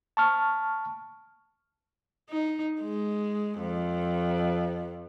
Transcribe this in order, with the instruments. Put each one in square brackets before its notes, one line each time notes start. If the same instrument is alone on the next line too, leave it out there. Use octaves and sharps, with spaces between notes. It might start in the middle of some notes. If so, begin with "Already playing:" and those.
[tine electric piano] A5 C#6 F6
[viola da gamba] D#4
G#3
F2